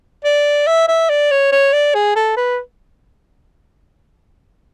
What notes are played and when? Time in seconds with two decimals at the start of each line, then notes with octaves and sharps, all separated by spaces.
0.24 D5
0.67 E5
0.88 E5
1.10 D5
1.31 C#5
1.52 C#5
1.73 D5
1.94 G#4
2.16 A4
2.37 B4